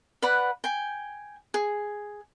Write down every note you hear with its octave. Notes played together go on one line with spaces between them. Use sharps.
B4 D5 F#5 B5
G5 G#5
G#4